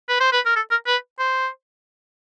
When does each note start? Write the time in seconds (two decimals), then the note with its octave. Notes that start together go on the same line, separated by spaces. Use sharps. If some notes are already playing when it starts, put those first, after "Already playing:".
0.09 B4
0.20 C5
0.33 B4
0.45 A#4
0.56 A4
0.71 A#4
0.87 B4
1.19 C5